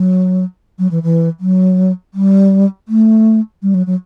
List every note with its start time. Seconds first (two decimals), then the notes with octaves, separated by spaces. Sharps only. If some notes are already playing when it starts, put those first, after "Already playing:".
Already playing: F#3
0.79 F#3
0.91 E3
1.03 E3
1.40 F#3
2.14 G3
2.88 A3
3.62 G3
3.74 F#3
3.87 F#3